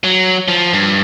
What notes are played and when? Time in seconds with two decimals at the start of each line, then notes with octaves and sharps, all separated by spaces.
0.04 F#3
0.48 F3
0.73 G2